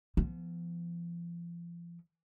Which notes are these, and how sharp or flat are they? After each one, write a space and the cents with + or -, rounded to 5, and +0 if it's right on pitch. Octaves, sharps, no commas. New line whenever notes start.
F3 -35 B3 +0